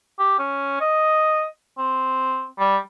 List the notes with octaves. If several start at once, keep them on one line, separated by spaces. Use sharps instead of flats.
G4
C#4
D#5
C4
G3